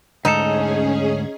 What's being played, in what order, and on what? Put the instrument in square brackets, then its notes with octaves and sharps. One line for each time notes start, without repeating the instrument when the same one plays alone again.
[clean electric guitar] D2 G#2 A4 [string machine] C#4 G#4 [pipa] D#4